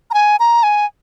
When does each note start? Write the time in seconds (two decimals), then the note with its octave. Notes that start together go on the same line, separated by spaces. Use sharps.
0.11 A#5
0.14 G#5
0.40 A#5
0.63 G#5